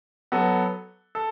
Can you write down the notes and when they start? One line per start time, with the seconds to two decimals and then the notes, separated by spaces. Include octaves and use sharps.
0.32 F#3 B3 F#4 A4
1.15 A4